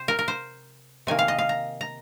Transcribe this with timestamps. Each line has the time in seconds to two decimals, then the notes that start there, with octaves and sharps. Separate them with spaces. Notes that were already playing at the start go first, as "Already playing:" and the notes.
Already playing: C3 C5
0.08 A#4
0.19 A#4
0.28 C5
1.07 C3 D#3 A#3 D#4 G#5
1.19 F5
1.28 D#5
1.38 F5
1.49 A#5
1.81 A#5